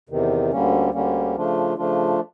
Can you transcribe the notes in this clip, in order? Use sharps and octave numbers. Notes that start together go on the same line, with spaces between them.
E2 C3 D#3
D2 D3 G3 A#3 C#4
D2 D3 G3 A#3 C#4
C#3 F3 A3 D4 F4
C#3 F3 A3 D4 F4